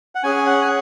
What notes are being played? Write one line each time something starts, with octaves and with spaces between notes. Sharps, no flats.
F#5
C#4 G#4 G#5
F#5
G#5